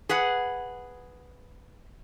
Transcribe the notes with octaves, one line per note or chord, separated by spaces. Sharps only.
G#4 B4 F#5